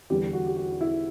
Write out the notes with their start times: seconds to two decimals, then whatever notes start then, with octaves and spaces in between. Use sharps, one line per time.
0.10 E2 D3 G3 G4
0.33 F#4
0.47 G4
0.57 F#4
0.81 E4